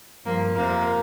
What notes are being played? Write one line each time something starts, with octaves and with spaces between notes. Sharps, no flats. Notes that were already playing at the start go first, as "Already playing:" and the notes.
G2 F3 A#3
F2 C3 F3 A#3